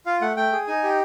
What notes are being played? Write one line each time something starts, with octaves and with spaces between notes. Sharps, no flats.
F4 F5
A3 F#5
A3 G5
G#4
D#4 G#5
G4